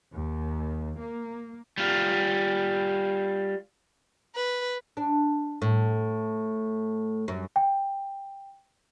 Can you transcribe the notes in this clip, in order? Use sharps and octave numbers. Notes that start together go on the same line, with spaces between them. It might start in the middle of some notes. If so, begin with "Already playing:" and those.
D#2
A#3
G3 F4
B4
D4
A2
F#2
G5